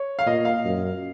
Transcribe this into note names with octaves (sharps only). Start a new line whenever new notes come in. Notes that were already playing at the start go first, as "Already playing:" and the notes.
Already playing: C#5
F5
A#2 D#5
F5
F#2